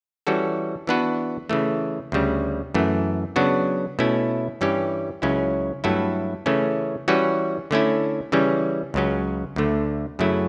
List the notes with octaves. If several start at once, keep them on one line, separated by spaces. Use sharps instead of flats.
E3 G3 C#4 F#4 A4
E3 B3 D4 F#4 B4
C#3 E3 A3
D2 C#3 G3
F#2 E3 A3
C#3 F#3 B3 D4 F#4
B2 A3 C#4 E4
G2 E3 G3 C#4 G4
C#2 C#3 F#3 C#4 E4
G2 F#3 A3 E4 A4
C#3 E3 A3 C#4
E3 G3 C#4 F#4 B4
D3 A3 C#4 E4
C#3 E3 G3 C#4
C#2 C#3 F#3 C#4
D2 D3 A3
F#2 C#3 F#3 A3 E4